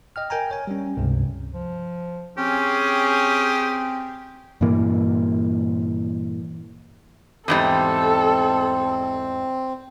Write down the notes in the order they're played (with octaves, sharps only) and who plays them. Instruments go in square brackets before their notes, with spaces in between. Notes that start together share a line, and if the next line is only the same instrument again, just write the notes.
[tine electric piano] D#5 G5 F6
A#4 G5 G#5 A#5
C#5 G#5
G3 C#4
C#2 G2 C3
[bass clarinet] F3
[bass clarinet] C4 [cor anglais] C#4 [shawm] G4 [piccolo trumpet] G#4
[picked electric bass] G2 A#2 E3 A#3
[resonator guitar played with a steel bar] E2 G#2 G3 [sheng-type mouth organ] C4 [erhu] A4